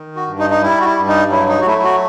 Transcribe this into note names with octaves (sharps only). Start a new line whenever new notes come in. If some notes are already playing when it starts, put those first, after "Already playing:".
Already playing: D#3
F#4
G2
D#4
D#4
G3 E4
F#4
E4
G2
D#4
F#3 E4
D#4
F#4
A3 E4
E4
F#4